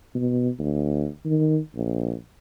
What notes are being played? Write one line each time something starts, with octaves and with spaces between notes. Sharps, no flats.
B2
D2
D#3
A#1